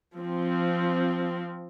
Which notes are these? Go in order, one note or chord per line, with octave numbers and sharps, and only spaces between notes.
F3 C4